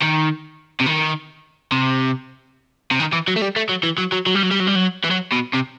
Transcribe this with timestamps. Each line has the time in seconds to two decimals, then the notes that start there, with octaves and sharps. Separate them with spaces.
0.03 D#3
0.81 C3
0.87 D#3
1.72 C3
2.91 C3
3.00 D#3
3.13 E3
3.28 F#3
3.36 A3
3.42 G3
3.56 A3
3.69 F#3
3.83 E3
3.98 F#3
4.12 F#3
4.26 F#3
4.35 G3
4.43 F#3
4.51 G3
4.60 F#3
4.67 G3
4.75 F#3
5.04 E3
5.10 F#3
5.32 B2
5.53 C3